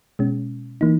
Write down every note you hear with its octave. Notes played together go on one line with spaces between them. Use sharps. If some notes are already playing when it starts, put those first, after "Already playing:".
B2 G#3 C#4
E3 A#3 D#4